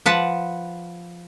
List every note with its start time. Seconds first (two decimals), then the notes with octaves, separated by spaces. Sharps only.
0.06 F3 B4 F#5 A5